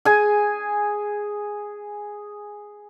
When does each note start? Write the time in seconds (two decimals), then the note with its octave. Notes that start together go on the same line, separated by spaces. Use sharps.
0.05 G#4 G#5